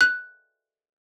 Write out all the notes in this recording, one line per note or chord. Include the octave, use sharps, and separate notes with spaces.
F#6